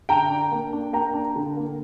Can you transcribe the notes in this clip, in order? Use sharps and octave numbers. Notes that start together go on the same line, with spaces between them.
D3 G5 A#5
D4
A#3
D4
A#3 G5 A#5
D4
D3
A#3